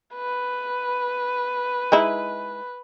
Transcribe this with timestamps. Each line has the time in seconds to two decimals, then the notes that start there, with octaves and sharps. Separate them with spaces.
0.15 B4
1.92 G#3 D#4 E4